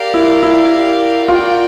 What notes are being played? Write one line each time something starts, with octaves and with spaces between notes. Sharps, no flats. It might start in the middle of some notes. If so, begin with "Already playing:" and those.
Already playing: G4 A#4 D5 F5
E4
E4
F4 F#4 A#4 D5 G5